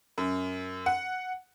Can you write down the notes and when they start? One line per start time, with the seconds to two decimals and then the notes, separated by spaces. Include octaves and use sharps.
0.18 F#2
0.86 F#5